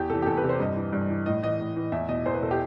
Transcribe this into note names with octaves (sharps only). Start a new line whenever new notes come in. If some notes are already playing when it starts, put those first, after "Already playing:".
Already playing: E2 G4
C3 E3 A4
G4
E2 A4
B4
C3 E3
C5
G2 D#5
E3
G2
E3
A2 D#5
E3 D#5
A2
E3
E2 E5
B2 D#5
E2 C5
B4
B2 A4
G4